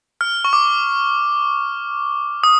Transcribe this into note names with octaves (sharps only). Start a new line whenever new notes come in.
F6
C#6
D6
D#6